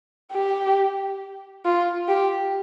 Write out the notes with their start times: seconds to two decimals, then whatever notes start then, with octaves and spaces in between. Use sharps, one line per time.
0.32 G4
1.65 F4
2.08 G4